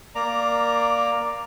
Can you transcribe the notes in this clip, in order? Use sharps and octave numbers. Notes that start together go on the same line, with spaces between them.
A#3 D5 A#5